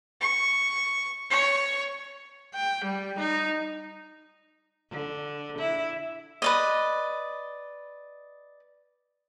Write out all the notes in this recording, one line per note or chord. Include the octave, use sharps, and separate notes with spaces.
C#6
C#5
G5
G3
D#4
D3
E4
B4 D5 D#5